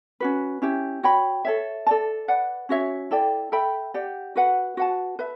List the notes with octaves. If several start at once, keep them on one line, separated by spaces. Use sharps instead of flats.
C#4 F#4 B4
C#4 E4 G4
F#4 C#5 G5 B5
A4 C#5 E5
A4 D5 A5
B4 D5 F#5
C#4 F#4 C#5 E5
E4 A4 D5 G5
A4 E5 G5 B5
G4 D5 F#5
F#4 B4 F#5
F#4 B4 F#5 A5
B4 E5